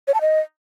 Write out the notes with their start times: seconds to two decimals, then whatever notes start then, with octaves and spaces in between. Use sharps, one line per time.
0.08 C#5
0.14 A5
0.21 D#5